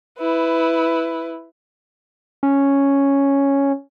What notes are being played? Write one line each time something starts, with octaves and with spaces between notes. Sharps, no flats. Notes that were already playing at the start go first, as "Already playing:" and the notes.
E4 B4
C#4